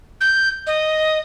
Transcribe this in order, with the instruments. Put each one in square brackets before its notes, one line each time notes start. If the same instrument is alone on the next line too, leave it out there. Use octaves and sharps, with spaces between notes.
[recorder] G6
D#5